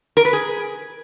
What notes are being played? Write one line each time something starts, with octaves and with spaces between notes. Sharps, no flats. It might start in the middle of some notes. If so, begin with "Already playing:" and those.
A#4
B4
G#4